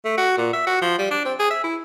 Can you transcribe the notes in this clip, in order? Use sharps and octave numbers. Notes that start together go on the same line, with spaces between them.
A3
F#4
A#2
E5
F#4
F3
G3
D4
C4
G#4
E5
E4